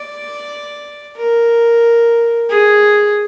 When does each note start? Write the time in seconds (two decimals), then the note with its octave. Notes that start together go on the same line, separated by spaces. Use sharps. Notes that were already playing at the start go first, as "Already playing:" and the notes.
Already playing: D5
1.17 A#4
2.50 G#4